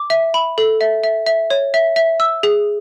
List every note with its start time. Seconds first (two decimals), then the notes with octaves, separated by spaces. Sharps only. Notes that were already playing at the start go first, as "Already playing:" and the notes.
Already playing: D6
0.10 E5
0.34 B5
0.58 A4
0.81 E5
1.04 E5
1.26 E5
1.50 C#5
1.74 E5
1.96 E5
2.20 E6
2.43 G#4